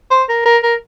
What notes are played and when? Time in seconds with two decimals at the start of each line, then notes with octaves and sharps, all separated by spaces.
0.11 C5
0.29 A#4
0.46 A#4
0.63 A#4